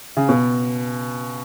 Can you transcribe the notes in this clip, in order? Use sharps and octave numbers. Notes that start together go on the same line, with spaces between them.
C#3
B2